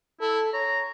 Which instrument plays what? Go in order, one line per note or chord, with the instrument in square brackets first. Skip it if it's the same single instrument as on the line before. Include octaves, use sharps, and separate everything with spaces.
[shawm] E4 [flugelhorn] A4
[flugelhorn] C#5 [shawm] A#5